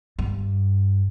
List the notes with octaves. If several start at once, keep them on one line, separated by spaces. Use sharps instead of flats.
G2